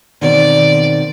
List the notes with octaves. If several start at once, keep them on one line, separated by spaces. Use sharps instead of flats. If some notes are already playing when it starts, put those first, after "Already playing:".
B2 D#3 C4 D5